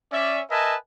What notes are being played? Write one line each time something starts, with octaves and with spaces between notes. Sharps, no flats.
C#4 D5 E5
A#4 B4 D#5 E5 G#5 A5